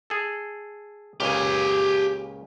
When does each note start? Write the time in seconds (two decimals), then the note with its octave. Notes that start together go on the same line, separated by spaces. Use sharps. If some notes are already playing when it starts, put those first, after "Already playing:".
0.10 G#4 A4
1.20 C#2 A#2 C#3 G4 G#5